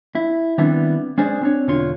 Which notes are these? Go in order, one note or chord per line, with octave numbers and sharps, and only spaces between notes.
E4
D#3 G3 B3 C4 D4 E4
G#3 C#4 D4 G#4 C5 D5
C4 D4 C#5
B1 E2 D3 F4 C#5 C6